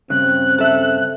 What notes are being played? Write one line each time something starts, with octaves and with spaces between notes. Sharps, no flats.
G2 C#3 C4 F#6
A4 E5